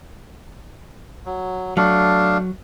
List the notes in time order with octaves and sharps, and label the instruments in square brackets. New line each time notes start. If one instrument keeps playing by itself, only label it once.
[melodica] F#3
[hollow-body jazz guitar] F#3 [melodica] A3 D4 F5